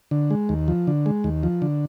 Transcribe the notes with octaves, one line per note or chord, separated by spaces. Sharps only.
D3
G#3
D#2
F3
D3
G#3
D#2
F3
D3